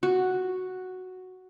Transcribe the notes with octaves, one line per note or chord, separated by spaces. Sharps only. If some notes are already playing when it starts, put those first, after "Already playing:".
F#4